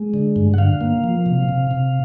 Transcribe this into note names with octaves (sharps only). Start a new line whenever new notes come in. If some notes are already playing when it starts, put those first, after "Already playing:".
Already playing: G#3
D3
G2
F#5
D3 F5
A#3
F3
C3
C3
C3